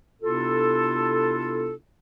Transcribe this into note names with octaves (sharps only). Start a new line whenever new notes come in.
C3 B3 D4 E4 F4 A4